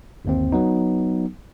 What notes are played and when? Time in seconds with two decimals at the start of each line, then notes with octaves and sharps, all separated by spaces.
0.25 G1 D#2 C4
0.52 F#3 B3 D#4